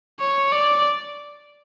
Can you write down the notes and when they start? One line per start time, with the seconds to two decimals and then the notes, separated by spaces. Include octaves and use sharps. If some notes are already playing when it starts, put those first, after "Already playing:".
0.20 C#5
0.52 D5